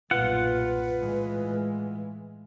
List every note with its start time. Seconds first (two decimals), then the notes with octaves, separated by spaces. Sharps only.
0.11 B1 G2 A#2 F4 B4 F#5
0.98 A2 E3 G#3